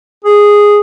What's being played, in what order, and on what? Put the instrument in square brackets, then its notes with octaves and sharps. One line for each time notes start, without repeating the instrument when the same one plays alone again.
[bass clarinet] G#4